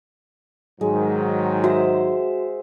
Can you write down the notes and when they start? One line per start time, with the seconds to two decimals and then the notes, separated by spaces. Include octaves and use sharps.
0.81 G#2 D#3 F#3 G#3
1.64 F#4 C5 E5 F#5